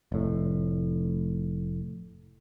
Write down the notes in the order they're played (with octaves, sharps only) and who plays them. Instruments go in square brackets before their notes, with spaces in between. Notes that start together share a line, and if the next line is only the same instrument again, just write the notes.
[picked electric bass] F1 A2